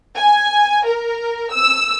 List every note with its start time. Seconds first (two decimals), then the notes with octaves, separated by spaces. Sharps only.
0.17 G#5
0.87 A#4
1.53 E6